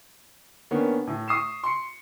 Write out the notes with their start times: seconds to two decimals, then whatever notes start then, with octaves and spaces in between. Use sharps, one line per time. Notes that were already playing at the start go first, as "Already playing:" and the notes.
0.71 D#3 A#3 B3 C#4 D4
1.07 A2
1.28 C#6 D#6 C7 E7
1.63 C6 C#7